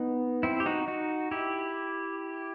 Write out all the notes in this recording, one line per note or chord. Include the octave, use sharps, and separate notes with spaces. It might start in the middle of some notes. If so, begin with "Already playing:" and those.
Already playing: B3 D#4
C4 E4
G4
D#4 F#4
D#4 F#4
E4 G4